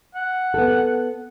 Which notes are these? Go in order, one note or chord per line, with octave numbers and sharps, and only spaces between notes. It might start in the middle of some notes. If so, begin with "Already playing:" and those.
F#5
B3 A4